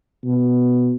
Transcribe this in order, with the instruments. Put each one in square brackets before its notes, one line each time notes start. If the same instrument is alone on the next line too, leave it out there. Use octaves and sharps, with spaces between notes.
[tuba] B2